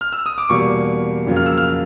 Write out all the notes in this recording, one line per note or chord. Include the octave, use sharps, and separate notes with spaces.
F6
E6
D#6
D6
E2 B2 G3 A#3 C#6
F2 C#3 F#3 A#3
F6
E6
F6